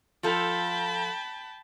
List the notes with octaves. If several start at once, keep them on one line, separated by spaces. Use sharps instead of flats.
F3 F4 A4 G5 A5 B5